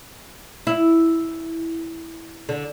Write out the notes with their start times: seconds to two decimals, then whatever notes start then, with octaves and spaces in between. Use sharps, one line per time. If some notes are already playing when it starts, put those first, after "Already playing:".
0.67 E4
2.49 D3